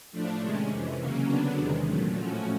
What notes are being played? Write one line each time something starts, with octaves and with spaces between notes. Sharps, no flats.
A2 F3 A3 D4
C3 D#3 G#3 C#4
F2 C3 E3
C#3 F#3 A#3 C#4
D3 F#3 B3 D4
E2 C3 D#3 G#3
A#2 F#3 A3
A2 F3 A3 C#4 F#4